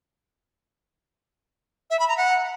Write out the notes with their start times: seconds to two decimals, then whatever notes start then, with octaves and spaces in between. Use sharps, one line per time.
1.90 E5
1.99 B5
2.08 A#5
2.17 F#5